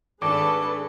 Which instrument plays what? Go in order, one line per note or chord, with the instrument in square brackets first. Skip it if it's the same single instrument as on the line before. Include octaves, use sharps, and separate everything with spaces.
[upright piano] G#1 [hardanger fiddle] A3 A4 [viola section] D4 G#4 B4 [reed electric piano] D6